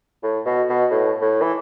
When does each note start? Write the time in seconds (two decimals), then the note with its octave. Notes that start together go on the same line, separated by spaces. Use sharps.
0.23 A2
0.46 B2
0.70 B2
0.91 A2
1.21 A2
1.42 E3